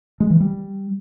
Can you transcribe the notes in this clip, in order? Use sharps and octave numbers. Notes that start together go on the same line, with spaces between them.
G#3
E3
G3